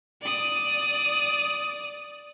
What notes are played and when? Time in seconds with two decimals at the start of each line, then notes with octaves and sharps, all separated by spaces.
0.22 D5 D#6